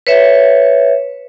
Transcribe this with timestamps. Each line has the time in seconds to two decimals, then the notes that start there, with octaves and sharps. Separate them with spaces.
0.07 B4 C#5 E5